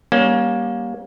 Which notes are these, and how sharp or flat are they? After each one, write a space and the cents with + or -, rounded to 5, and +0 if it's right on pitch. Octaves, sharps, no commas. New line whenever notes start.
G3 +0 A#3 +30 C#4 +0